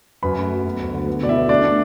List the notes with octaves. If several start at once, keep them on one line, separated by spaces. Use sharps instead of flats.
F#2 B4 B5
A3
F#3
B3
D2
D3
B3
B2 D5
E4 E5
B3
A3 D4 D5
A3